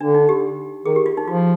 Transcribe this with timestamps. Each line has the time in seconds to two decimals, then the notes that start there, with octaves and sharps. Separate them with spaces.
0.01 D3 D4
0.15 D#4
0.29 G4
0.86 D#3 G#4
0.96 G4
1.06 F4
1.17 D#4
1.28 F3 F4